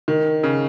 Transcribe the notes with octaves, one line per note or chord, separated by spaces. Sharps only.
D#3
C#3